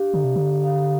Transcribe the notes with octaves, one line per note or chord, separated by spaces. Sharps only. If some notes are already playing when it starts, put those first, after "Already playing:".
Already playing: D4 G4 F5
D3 D5
C3
D3 G4
F5